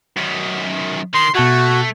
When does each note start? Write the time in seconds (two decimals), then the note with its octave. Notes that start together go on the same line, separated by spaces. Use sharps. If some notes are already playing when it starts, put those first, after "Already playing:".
0.17 F#2 D#3 B6
1.14 D#3 C6
1.35 B2 A3 F#4 A5 G#6